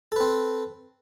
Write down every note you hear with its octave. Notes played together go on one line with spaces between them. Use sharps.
C4 A4 B4